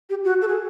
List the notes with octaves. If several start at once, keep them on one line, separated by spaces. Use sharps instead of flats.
G4
F#4
A4
G#4